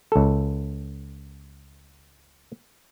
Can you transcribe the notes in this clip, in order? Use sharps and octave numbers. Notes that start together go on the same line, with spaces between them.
C#2 A4